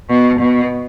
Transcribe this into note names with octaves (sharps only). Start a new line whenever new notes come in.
B2
B2